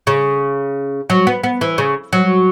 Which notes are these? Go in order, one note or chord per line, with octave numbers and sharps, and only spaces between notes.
C#3
F#3
B3
B3
E3
C#3
F#3